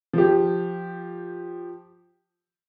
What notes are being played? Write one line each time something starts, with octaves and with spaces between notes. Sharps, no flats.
F3 G4